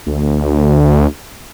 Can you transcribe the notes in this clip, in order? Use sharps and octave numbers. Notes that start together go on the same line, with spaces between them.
D2